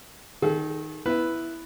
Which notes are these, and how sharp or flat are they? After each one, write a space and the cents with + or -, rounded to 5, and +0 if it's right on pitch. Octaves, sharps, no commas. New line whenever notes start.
D#3 +0 A4 -45
B3 +0 E4 +0 B4 +0